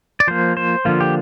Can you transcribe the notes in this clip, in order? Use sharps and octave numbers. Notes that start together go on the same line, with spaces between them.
D5
F3 A#3 C5
C5
D3 F3 A#3 F4
G4